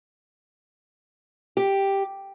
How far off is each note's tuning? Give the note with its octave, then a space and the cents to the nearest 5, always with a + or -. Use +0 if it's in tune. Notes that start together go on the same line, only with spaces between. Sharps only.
G4 +0